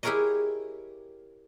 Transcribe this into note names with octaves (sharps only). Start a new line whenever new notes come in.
E4 G4 G#4 A#4 C#5 D#5